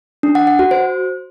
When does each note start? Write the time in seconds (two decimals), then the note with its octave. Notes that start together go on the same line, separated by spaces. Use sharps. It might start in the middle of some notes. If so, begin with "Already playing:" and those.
0.23 D4
0.35 F#5
0.47 F#5
0.59 F#4
0.71 C5